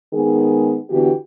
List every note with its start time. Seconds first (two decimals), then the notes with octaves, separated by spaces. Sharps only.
0.14 D#3 G#3 B3 G#4
0.90 D3 E3 B3 F#4 G4